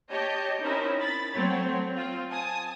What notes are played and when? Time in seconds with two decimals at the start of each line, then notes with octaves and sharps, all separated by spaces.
0.11 G4 C#5 D#5 A5 G6
0.61 C4 C#4 D#4 E4 A#4
1.01 B5 A6
1.35 F#3 A3 C4 C#5
1.91 C4 F4
2.30 G#5 A5 D#6